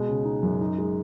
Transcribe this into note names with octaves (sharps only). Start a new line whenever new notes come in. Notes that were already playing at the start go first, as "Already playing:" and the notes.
Already playing: B2 G#3
C#3
D#4
F#2
D#4
G#3